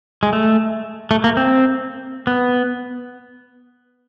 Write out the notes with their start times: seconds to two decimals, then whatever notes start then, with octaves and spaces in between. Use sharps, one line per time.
0.23 G#3
0.33 A3
1.11 A3
1.24 A#3
1.37 C4
2.27 B3